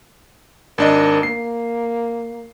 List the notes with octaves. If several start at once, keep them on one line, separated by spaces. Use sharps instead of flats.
G#1 D4 A#4 D#5
A#3 C7